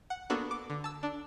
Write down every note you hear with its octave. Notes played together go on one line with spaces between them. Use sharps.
F#5
A#3 B3 D4 F#4 A4
D6
D3
A5 E6
D4